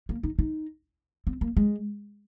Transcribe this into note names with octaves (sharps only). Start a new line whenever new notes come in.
A#3
D#4
D#4
C4
A#3
G#3